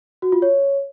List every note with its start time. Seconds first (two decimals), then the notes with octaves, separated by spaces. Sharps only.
0.22 F#4
0.32 F4
0.42 C#5